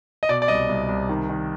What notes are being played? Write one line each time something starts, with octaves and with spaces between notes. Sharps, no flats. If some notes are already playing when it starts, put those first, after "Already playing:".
D#5
B2 D5
D5
C2 D#5
C2
C2
D#3
D#3